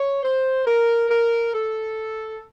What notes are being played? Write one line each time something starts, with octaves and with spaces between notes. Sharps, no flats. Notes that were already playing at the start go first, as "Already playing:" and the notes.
Already playing: C#5
C5
A#4
A#4
A4